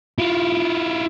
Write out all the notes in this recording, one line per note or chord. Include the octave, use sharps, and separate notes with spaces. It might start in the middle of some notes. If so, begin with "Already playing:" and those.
E4 F4